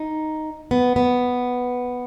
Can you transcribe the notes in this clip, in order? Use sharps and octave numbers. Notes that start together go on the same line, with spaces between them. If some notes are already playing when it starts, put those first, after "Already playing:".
Already playing: D#4
B3
B3